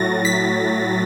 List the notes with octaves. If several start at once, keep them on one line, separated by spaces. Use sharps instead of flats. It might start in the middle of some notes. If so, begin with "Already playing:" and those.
Already playing: A2 F#3 A6 A#6
B6